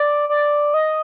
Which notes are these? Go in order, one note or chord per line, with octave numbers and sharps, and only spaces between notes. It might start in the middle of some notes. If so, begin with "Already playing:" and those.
Already playing: D5
D5
D#5